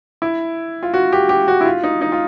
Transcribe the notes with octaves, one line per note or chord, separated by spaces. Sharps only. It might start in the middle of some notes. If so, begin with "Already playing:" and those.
E4
F4
F#4
G4
G4
F#4
E4
F4
D#4
D#4
F4